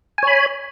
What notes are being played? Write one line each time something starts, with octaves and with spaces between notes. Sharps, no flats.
C#5 G#5 B5